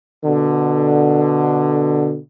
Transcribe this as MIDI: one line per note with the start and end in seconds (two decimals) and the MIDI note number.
0.25 2.18 47
0.25 2.18 50